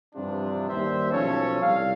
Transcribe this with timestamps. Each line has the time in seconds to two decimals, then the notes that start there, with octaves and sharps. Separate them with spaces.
0.15 G2 C3 E3 F3 D4
0.69 D#2 G3 C5 E5
1.12 B1 F3 C#4 A4 C#5
1.62 C2 G3 F5